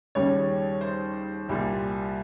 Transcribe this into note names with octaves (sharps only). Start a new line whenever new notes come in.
D#2 C#3 G3 C#5
C5
C2 A#2 G3